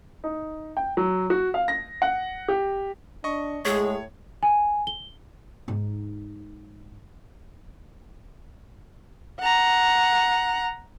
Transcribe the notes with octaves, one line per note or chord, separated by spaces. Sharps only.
D#4
G5
F#3
F#4
F5
A#6
F#5
G4
D4 D#5 C#6
A2 G#3 G#4 C#5
G#5
G7
G#2 D#4
F#5 A#5